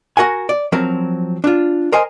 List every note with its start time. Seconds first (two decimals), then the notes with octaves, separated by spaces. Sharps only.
0.17 F#4 A#4 F#5 G#5
0.49 D5
0.72 F3 F#3 C4 A#4
1.44 D4 F4
1.92 A#4 C5 D#5 G#5